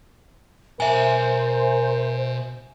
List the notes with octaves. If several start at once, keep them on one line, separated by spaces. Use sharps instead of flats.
B2 A#4 C5 E5 G#5 A#5